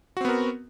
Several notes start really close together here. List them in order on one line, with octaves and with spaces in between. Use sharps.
F#4 C4 B3 A#4